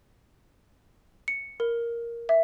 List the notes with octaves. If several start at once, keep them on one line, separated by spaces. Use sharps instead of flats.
C#7
A#4
E5